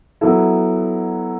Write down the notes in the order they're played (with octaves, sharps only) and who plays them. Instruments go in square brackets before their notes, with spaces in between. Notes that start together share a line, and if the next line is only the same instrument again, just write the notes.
[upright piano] F#3 B3 E4 A4